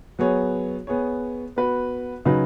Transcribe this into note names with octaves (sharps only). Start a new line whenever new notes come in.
F#3 B3 G#4 C#5
B3 G#4 C#5
B3 F#4 B4
C#3 F#3 D#4 B4